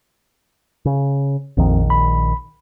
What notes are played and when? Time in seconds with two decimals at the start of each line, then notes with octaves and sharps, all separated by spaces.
0.85 C#3
1.57 A#1 F2 D#3
1.90 B5